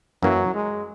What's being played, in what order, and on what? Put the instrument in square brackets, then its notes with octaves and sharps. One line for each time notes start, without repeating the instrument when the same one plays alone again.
[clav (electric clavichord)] F#2 E3 A#3 E4 [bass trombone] F#3
[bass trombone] G#3